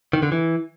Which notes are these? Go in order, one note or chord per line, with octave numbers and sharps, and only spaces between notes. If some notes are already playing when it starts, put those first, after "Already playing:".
D#3
D3
E3